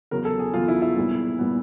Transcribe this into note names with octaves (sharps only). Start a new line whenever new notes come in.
E2 C#3 F#3 A#4
A4
G#4
E2 C#3 F#3 F4
E4
E4
B1 A#2 G3 B3
A#2 G3 B3